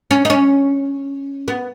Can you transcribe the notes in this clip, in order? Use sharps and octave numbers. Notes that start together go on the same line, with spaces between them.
C#4
D#4
C#4
B3